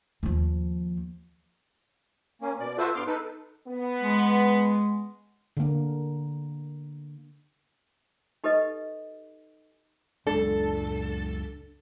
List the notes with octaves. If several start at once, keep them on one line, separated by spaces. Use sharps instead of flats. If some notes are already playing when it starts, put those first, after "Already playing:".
D#2 F3
A#3 C#4
B2 D5
F4 F#4 A4 B4 C5 E5
G2 B3 C6 D6 F6
D#4 A4 B4
B3
G#3
D3 A#3
D#4 G4 A4 B4 D#5
C#2 F#2 G#3 D4 A4